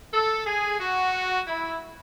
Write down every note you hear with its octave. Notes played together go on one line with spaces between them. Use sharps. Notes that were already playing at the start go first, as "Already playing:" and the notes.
A4
G#4
F#4
E4